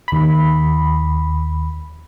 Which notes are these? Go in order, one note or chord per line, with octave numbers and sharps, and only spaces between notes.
D#2 B5